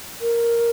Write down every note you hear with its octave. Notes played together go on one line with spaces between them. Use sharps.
A#4